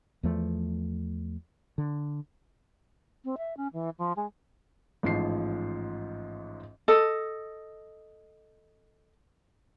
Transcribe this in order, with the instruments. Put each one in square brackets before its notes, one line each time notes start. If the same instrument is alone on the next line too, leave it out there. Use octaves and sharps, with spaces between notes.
[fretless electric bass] E2 F3 A3
D3
[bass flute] C4
E5
C#4
E3
F3
G#3
[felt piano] A1 G#2 F3 F4 C7
[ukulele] A4 D#5